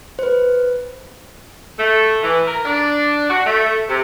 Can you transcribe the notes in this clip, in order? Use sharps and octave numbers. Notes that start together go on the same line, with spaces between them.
B4 C5
A3
E3
A#4
D4
F#4
A3
C3